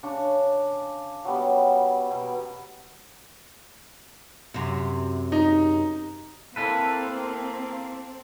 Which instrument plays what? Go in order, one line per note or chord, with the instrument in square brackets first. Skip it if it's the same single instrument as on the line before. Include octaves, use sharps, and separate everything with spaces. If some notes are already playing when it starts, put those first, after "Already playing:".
[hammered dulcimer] C#3 D4 C#6
F#3 G3 B3
B2
[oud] F#2 C3
[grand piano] D#4
[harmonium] A#3 F5 [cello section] C4 [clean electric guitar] E4 A4 B4